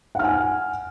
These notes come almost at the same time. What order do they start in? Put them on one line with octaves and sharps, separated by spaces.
F#5 F6 G#5